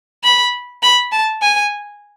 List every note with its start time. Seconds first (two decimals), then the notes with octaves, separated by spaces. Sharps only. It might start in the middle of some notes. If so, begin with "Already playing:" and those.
0.23 B5
0.83 B5
1.12 A5
1.42 G#5